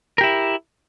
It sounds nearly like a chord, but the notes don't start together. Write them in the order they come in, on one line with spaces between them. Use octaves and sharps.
A#4 G4 E4